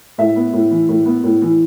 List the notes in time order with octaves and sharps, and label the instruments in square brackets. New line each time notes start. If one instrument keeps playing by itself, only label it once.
[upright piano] A2 E5
B3
A2
E3
A2
B3
A2
E3